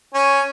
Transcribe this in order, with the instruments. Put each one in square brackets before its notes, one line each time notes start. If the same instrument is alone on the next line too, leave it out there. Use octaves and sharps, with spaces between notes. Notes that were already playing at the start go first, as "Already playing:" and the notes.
[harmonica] C#4